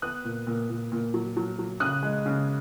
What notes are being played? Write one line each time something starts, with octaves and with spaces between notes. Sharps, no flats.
B3 D#6 F#6
A#2
A#2
A#2
A#2
F#3
F#3
F#3
C#3 D#6 F#6
G#3
C#3